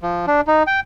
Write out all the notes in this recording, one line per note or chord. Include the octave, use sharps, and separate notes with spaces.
F3
D4
D#4
G5